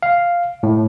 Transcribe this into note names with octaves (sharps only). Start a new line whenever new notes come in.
F5
A2